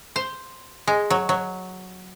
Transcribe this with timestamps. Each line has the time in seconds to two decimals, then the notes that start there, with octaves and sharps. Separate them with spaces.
0.16 C5
0.87 G#3
1.10 F#3
1.29 F#3